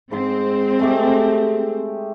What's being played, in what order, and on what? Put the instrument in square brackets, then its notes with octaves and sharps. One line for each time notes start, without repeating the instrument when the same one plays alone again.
[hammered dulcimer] G#2 C6 [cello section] C4
[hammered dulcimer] G#3 A3 G4